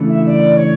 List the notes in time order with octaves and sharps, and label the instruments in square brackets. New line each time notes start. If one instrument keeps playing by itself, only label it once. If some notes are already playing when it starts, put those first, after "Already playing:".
Already playing: [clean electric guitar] C#3 E3 A3 D4
[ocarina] E5
D5
C#5